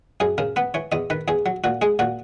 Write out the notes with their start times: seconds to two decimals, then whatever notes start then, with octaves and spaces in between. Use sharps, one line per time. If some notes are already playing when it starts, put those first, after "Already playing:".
0.20 F#2 G#4
0.38 C#3 A#4
0.56 B3 B4
0.74 E3 C#5
0.92 E2 D#5
1.10 D#3 B4
1.28 E2 G#4
1.46 F#3
1.64 A#2 F#4
1.82 G#3 G#4
1.99 A#2 F#4